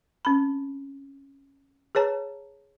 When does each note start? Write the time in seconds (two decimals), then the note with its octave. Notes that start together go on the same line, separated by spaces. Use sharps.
0.25 C4 C#4 B5
1.95 G#4 B4 C#5 A5 A#5